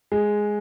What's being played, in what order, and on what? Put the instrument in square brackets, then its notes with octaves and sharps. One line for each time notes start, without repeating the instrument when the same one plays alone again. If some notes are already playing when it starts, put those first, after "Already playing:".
[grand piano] G#3